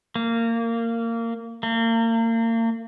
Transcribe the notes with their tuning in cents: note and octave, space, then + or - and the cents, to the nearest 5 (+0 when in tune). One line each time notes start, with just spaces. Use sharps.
A#3 -20
A#3 -35